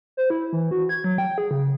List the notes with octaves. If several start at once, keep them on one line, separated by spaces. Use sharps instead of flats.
C5
E4
E3
F#4
G#6
F#3
G5
G#4
C#3
C#3